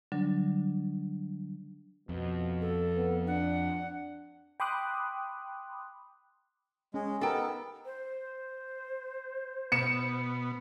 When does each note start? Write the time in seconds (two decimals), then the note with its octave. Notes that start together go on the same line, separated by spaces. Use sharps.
0.12 D3 F#3 G3 D4
2.09 F2 B2
2.61 A4
2.96 B3
3.27 D4 F#5
4.60 G5 B5 C6 D6 D#6 F#6
6.94 G#3 C#4
7.21 B3 D#4 G4 A4 A#4 G5
7.86 C5
9.72 B2 B3 C#7 E7